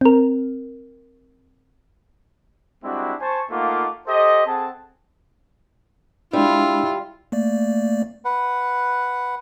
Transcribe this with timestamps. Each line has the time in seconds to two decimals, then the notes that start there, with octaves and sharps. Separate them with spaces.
0.01 C4 A#4
2.83 G3 G#3 C4 D4 E4 F#4
3.20 C5 G#5 A5 C#6
3.51 A3 A#3 D#4 F4 F#5 D6
4.07 G4 A4 C5 D#5
4.46 C4 G#4 A4 F#5 A5
6.33 G3 G#3 D4 E4 F4
7.32 A3 A#3 D5
8.25 B4 F#5